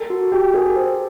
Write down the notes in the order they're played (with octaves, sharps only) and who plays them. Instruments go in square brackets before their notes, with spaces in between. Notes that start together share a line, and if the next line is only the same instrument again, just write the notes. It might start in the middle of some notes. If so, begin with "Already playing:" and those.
Already playing: [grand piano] A4 [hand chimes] A#4
[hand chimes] F#4
[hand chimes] F#4 [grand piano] G4
[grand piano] G#4 [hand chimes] A#4
[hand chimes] C5